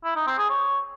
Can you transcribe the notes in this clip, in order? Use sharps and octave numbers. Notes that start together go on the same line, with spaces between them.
E4
D#4
C4
G#4
C#5